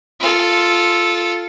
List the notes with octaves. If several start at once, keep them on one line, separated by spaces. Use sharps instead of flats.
F4 A4